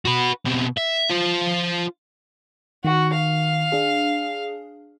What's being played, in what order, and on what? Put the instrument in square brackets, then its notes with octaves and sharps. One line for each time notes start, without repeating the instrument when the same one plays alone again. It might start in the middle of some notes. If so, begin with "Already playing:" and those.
[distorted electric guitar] F#4 B4
B2 C4
E5
F4 C5
[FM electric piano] D#3 [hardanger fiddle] F#4
[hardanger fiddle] F5
[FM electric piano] D4 G#4